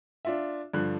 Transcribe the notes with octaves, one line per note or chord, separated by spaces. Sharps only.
D4 F4 E5
G2 D3 F3 F#6